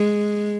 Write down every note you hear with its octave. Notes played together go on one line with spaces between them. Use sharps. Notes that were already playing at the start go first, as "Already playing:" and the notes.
Already playing: G#3